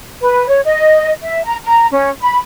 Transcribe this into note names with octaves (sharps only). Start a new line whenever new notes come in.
B4
C#5
D#5
E5
A#5
A#5
C#4
B5